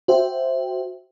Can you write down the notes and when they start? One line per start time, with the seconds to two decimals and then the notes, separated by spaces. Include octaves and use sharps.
0.08 F#4 C5 E5 G5